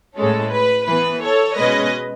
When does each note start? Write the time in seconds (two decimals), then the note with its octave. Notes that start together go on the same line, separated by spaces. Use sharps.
0.16 A2 G#3 C#4 A4
0.51 B4
0.87 E3 B3 B4
1.22 A4 C#5
1.57 B2 G#3 C#4 B4 D#5